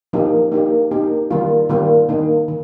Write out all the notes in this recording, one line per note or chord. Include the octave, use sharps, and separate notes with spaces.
F3 A#3 D#4 G4
A#3 D#4 G4
A#3 D#4 G4
D#3 G3 A#3 F4
D#3 G3 A#3 F4
D#3 A#3 D#4
D#3